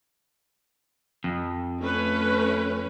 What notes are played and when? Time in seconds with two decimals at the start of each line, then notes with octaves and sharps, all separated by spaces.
1.24 F2
1.81 A3 C#4 B4